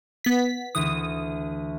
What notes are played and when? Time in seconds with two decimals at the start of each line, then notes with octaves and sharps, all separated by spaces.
0.25 B3 B6
0.75 D2 E3 D#6